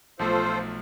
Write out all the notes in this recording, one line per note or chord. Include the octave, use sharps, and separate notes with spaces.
B1 F3 A3 F4 A4 C5